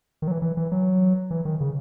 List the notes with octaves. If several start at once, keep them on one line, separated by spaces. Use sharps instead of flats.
D#3
F#3
E3
E3
E3
F#3
E3
D#3
C#3